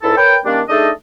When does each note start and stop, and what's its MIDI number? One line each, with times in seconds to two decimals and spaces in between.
0.02 0.13 37
0.02 0.13 44
0.02 0.13 64
0.02 0.13 69
0.17 0.38 70
0.17 0.38 71
0.17 0.38 73
0.17 0.38 79
0.45 0.62 51
0.45 0.62 55
0.45 0.62 58
0.45 0.62 61
0.45 0.62 62
0.69 0.90 57
0.69 0.90 62
0.69 0.90 63
0.69 0.90 68
0.69 0.90 69
0.69 0.90 75